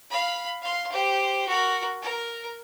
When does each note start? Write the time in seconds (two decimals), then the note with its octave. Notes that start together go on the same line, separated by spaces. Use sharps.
0.10 F5 B5
0.62 F5 C6
0.92 G4 C5
1.48 F#4 A#4
2.02 A#4